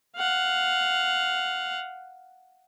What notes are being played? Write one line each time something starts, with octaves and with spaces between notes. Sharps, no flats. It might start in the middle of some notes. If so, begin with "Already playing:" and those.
F5 F#5